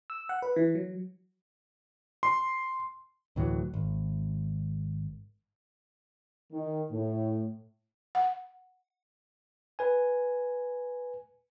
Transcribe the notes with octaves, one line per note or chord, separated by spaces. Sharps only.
E6
F#5
B4
E3
F#3
C6
D2 A2 E3 F#3
G#1
D#3
A2
F#5
B4 G#5